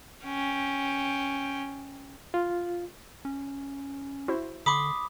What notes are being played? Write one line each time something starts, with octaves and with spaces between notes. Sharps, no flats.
C#4 G5
F4
C#4
E4 F#4 C5
D3 B5 C6 D6 D#6